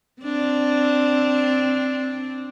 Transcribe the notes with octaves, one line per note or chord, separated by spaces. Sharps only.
C4 D4